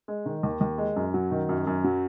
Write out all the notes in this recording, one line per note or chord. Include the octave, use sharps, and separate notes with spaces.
G#3
D#3
D#2
D#2
G#3
F#2
F#3
D#3
F#2
F#2
F#3